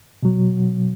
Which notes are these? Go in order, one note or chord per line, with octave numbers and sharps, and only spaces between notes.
B2 F#3